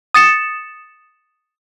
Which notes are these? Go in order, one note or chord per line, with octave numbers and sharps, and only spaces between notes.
D#6 A6 C#7 E7